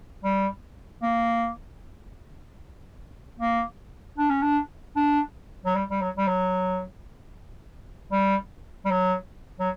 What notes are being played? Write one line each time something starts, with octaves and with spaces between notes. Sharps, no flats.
G3
A#3
A#3
D4
C#4
D4
D4
F#3
G3
G3
F#3
G3
F#3
G3
G3
F#3
F#3